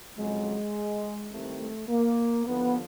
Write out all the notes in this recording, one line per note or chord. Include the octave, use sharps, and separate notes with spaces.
F2 C#3 F#3 G#3
C2 C3 D#3 A3
A3
A#3
D#2 D3 F3 B3